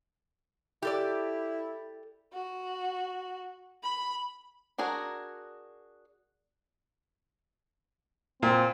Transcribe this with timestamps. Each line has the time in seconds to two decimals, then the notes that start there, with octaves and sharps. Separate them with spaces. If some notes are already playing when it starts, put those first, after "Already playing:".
0.82 E4 G4 A4 D5
2.33 F#4
3.83 B5
4.78 D4 F#4 G#4 A#4
8.43 A#2 C4